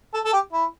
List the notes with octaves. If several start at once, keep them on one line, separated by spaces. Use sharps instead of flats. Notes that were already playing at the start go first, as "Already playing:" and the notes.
A4
A4
G4
E4